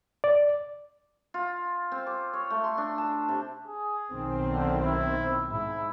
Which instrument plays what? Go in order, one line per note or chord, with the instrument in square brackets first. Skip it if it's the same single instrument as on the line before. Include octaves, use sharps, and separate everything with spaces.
[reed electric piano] D5
[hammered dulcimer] F4
C4
D6
C#5
A3
C6
D4
A5
C3
[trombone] G#4
[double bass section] B1 D#3 C4
[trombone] D3
E4
[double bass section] G#2 [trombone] E4